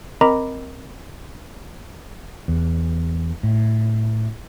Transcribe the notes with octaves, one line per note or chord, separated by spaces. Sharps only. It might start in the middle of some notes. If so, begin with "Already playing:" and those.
C4 A#4 D#5 A#5 B5 D6
E2
A2